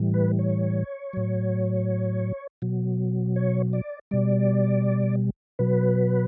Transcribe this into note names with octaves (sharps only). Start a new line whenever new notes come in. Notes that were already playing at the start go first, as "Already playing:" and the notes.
Already playing: A2 E3 G3
B4
C#5
A2 F#3
B2 F#3
C#5
D5
B2 G3 D5
B2 F#3 B4